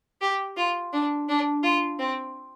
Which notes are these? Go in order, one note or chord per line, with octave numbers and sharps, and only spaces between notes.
G4
F4
D4
D4
F4
C4